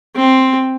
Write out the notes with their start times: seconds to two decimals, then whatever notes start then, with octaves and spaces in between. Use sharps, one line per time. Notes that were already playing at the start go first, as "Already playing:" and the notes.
0.15 C4